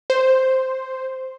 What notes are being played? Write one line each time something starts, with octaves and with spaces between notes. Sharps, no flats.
C5